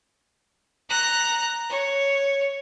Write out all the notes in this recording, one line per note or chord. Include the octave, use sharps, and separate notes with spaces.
A#5 F#6
C#5